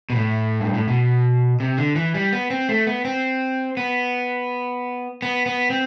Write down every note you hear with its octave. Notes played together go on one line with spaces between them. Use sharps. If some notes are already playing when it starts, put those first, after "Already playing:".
B2
A2
G2
A2
B2
C3
D3
E3
G3
B3
C4
A3
B3
C4
B3
B3
B3
C4